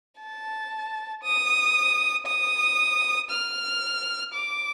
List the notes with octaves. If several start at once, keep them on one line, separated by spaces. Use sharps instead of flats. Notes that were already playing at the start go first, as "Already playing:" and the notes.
A5
D#6
D#6
F6
D6